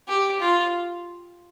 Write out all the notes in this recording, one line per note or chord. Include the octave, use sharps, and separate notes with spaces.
G4
F4